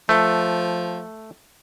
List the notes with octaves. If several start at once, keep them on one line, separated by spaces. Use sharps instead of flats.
F3 A3